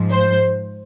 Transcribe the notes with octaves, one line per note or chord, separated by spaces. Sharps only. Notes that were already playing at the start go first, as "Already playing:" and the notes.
Already playing: G#2 F3
C5